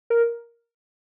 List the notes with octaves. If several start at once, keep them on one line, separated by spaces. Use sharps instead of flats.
A#4